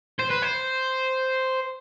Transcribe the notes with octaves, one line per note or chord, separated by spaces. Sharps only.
C5
B4
C5